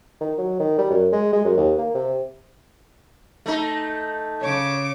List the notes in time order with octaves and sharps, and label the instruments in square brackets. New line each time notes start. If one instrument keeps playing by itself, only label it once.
[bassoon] D#3
F#3
D#3
G3
F#2
G#3
G#3
F#2
D#2
A#3
C3
[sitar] A3 D#4
[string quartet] C#3 D6 [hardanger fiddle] C#5